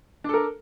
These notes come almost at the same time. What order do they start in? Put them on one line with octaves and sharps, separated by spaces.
D4 A4 A#4